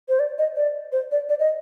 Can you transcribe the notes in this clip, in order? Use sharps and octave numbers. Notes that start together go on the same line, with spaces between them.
C5
D5
D#5
D5
C5
D5
D5
D#5